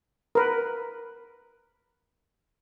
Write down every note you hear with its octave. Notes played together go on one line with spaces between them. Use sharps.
A#4 B4